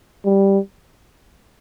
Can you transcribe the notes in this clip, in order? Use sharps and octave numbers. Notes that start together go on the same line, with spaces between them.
G3